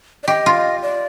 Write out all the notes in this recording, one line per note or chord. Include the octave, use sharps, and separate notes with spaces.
D5
G4 D#5
F4
D5